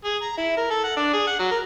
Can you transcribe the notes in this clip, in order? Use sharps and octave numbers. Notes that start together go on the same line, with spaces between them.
G#4
A#5
E4
A#4
A4
F#5
D4
G#4
F#5
F#3
A#4